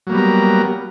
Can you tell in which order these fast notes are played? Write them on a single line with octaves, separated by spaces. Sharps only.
F#3 A#3 G3 B3 A#4